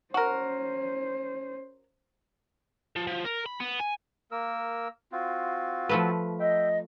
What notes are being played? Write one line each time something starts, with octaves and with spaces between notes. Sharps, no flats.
C#4 F#4 A#4 C5
F3
F3
A#4
B5
B3
G#5
A#3 A#4 E6
C4 F4 F#4
F3 A3 B4
D#5 E5 G5